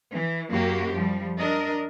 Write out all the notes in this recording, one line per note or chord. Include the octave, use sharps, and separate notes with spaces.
E3
F#2 A#3 F#4 G4
F3 G3
D4 A#4 D#5